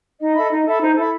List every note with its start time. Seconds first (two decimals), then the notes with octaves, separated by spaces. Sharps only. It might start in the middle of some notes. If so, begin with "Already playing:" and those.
0.20 D#4 D#5
0.35 A4 E5 B5
0.51 D#4
0.66 A4 E5 B5
0.81 D#4 C5
0.96 E4 A4 E5 B5